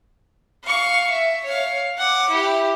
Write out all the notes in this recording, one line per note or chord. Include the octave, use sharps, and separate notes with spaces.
F5 C#6
E5
C#5 F5
F#5 D6
E4 G4